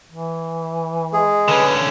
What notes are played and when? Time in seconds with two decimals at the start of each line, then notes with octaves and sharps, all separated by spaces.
0.12 E3
1.13 G#3 G#4
1.48 D3 C#4 B4